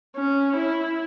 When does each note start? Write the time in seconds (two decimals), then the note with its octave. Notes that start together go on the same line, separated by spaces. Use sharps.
0.17 C#4
0.57 E4